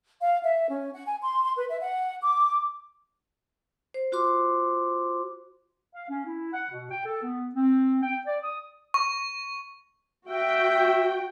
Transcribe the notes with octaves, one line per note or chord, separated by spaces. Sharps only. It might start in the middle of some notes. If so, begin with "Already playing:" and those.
F5
E5
C#4
F#5
G#5
C6
C6
B4
E5
F#5
D6
C5
F4 F#4 C5 C6 D6
F5
C#4
E4
F#5
B2
G5
A4
B3
C4
G5
D5
D#6
C#6
F#4 E5 G5